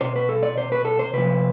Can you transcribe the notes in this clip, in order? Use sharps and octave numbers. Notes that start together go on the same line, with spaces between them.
B2 C5
B4
A4
D5
C5
B4
A4
C5
C3 F3 B4